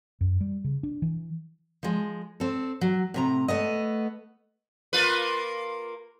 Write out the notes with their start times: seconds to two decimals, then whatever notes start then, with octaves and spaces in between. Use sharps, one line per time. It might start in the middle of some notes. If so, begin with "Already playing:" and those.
0.21 F#2
0.41 G3
0.64 C#3
0.83 D4
1.02 E3
1.83 F3 G#3
2.40 C4 A4
2.81 F#3
3.14 A2 C3 A#5
3.48 A3 B3 D#5
4.93 A#3 F4 B4